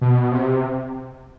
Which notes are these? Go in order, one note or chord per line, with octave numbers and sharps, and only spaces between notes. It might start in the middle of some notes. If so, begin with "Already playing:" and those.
B2
C3